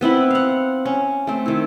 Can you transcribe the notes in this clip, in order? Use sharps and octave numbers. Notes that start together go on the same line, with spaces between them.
B3 C4 E4 B5
F5 F#5
C#4
A3 C4
D#3 E4